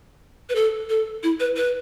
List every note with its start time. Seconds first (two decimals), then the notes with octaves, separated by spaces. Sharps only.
0.49 B4
0.55 A4
0.90 A4
1.23 E4
1.40 B4
1.56 B4